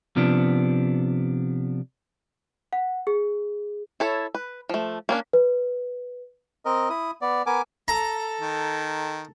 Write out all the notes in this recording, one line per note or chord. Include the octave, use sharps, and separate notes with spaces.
C3 F3 B3 D4
F#5
G#4
E4 A4 C#5
B4
F3 A3
A#3 C#4 D4
B4
C4 A#4 D#5
E4 D#6
B3 D5
B3 A#4 G#5 D6
A4 A#5
D#3